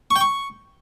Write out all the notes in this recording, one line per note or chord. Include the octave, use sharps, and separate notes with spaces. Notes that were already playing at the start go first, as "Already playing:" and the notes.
C#6
G5
C#6